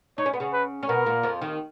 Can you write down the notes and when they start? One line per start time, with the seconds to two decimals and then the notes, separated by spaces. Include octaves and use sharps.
0.18 D#4 C#5
0.26 C#4
0.33 B3
0.40 C#3 C#4
0.53 B4
0.83 C#4
0.89 B2 B3 A#4
1.06 A#2 A#3
1.23 F2 F3
1.42 D#2 D#3